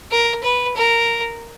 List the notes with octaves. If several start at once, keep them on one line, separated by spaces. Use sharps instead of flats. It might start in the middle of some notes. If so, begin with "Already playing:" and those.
A#4
B4
A#4